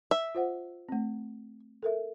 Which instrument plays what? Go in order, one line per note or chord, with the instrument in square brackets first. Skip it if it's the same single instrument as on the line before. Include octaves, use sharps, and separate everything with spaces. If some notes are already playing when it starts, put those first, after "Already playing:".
[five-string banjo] E5
[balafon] F4 C5 F#5
A3 C4
A4 A#4 E5